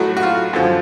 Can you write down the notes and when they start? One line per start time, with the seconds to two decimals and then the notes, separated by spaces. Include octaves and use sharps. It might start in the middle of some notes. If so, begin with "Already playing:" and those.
Already playing: A2 F#3 A3 F#4
0.17 F#4
0.23 F4
0.53 F#2 D3 F3